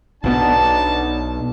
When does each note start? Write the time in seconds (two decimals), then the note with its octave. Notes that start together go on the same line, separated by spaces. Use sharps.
0.24 B1 B2 B3 D4 D#4 A5